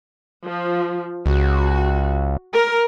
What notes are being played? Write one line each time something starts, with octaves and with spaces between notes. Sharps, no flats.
F3
C#2 F#4
A#4